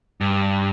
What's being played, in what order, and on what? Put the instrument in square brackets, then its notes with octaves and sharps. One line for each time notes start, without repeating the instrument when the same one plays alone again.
[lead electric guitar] G2